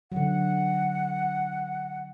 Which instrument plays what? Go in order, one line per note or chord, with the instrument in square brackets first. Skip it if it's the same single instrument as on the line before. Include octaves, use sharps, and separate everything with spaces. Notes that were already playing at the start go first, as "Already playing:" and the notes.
[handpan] D3 F#3 [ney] F#5